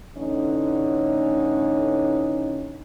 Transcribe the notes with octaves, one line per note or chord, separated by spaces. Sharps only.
A1 D3 C#4 D#4